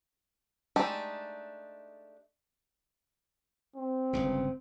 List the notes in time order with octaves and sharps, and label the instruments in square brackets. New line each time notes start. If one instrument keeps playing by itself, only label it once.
[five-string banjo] G#3 A3 D4 D#4 G4
[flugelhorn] C4
[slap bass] G1 C#2 C#3